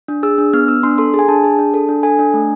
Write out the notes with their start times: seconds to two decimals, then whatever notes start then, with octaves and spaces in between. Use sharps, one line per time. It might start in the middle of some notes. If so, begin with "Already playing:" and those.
0.08 D4
0.23 G#4 E6
0.38 D4
0.53 B3 F6
0.68 B3 E6
0.83 D4 C6
0.98 A4 C6
1.14 G#4
1.19 G#5
1.28 D4 A5
1.44 G#4
1.59 D4
1.74 A4
1.89 D4
2.03 A4 G#5
2.19 D4
2.34 A3